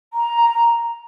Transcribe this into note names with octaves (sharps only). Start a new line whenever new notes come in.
A#5
A#5